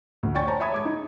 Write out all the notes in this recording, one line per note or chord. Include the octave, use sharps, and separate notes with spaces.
D2
C#5 D5 G5 G#5 C#6 A6
C5 C#5 A5 A#5
C#5 E5 B5 D#6 G#6
G#3 D6 G#6
D#4